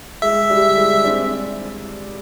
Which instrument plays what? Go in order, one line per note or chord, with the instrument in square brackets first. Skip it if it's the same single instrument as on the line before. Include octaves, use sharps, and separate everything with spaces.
[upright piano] G#3 [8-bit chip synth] E5
[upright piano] G3
G#3
C4 D4